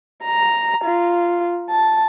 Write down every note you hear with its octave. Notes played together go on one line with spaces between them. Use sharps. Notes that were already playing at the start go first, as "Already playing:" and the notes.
A#5
F4
A5